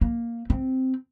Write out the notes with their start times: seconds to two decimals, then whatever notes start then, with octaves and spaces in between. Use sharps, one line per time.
0.01 A#3
0.50 C4